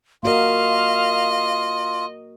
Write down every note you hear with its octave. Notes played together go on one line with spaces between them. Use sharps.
A#3 F4 F#4 A#4 D#5 F5